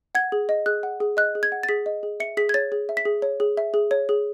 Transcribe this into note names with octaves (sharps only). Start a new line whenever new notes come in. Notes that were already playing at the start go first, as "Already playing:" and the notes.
F#5 G#6
G#4
D#5
G#4 F#6
F#5
G#4
D#5 F#6
G#4
G#6
F#5
A6
G#4 B6
D#5
G#4
E5 C#7
G#4 B6
G#6
C#5 A6
G#4
E5
B6
G#4
C#5
G#4
E5
G#4
C#5
G#4